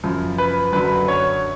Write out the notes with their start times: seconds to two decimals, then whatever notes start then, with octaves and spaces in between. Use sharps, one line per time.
0.04 F#2 C#3 F3
0.38 B4
0.72 F#2 D3 F#3 B4
1.08 C#5